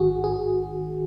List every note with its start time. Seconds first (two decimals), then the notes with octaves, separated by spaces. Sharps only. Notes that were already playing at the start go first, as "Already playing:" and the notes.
Already playing: A1 G#2 D#3 F#4 G#4
0.24 G#4